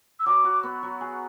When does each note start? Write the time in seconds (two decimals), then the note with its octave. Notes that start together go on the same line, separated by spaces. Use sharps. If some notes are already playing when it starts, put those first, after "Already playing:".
0.20 E6
0.26 F#3 D6
0.44 F#4
0.63 B3
0.83 F#3
1.01 G#4